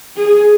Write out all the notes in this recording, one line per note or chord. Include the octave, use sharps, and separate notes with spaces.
G#4